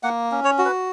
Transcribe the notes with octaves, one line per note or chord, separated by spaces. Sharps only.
A#3 F#5
C#4
C#5
F#4
B4